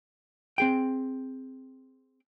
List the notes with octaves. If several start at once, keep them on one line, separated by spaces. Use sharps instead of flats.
C4 G#4 G5